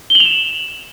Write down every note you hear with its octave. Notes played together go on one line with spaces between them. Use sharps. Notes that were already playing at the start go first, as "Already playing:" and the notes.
G7
F#7
F7
E7